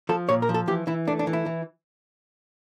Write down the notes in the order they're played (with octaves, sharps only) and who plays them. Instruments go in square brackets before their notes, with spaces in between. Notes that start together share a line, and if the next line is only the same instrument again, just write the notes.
[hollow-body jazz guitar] F3 A4
A#2 C#5
A#4
F3
A4
E3 G4
E3 E4
A3 D4
D4
E3
E4
E3